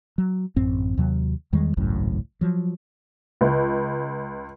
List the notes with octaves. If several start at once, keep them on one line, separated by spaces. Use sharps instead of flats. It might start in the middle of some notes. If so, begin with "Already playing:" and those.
F#3
A1 F#2 C4
D#2 C3 F#3
E2 D#3 G3 G#3
G#1 C#2 F#2 A2
F3 F#3
C#2